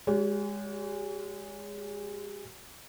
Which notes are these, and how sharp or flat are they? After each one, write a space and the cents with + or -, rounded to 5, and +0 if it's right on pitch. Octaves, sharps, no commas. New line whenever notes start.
G#3 -20 F#4 +45 C#5 +40